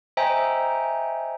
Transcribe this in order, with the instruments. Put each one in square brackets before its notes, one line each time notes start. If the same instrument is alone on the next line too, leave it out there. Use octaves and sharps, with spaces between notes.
[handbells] C5 D#5 E5 G5 G#5 A#5